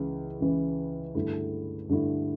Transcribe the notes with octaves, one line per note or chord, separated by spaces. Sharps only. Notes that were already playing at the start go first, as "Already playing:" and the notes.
Already playing: C#2 C#3 E3
C#2 C#3 E3
G2 D3 A3 E4
G2 D3 A3 E4